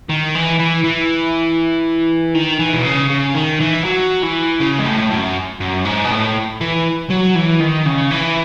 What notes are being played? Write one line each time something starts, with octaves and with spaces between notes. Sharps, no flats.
D#3
E3
E3
E3
D#3
E3
B2
C#3
C#3
D#3
E3
F#3
E3
C#3
G#2
A2
F#2
F#2
G#2
B2
A2
E3
F#3
E3
D#3
C#3
E3